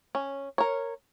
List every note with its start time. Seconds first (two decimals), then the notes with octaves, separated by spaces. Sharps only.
0.15 C#4
0.58 A#4 C#5